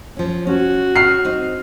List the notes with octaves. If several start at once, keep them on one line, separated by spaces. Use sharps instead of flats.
F3 C#4
C#4 F#4
F6 C7
C4 D#4